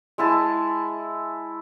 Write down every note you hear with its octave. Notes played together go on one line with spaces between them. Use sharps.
G#3 E4 A5